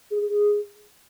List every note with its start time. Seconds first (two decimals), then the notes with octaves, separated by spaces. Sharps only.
0.11 G#4
0.28 G#4